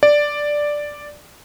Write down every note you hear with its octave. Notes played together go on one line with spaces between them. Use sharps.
D5